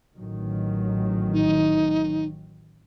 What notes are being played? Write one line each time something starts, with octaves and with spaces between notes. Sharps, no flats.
A1 D#3 F#3
D#4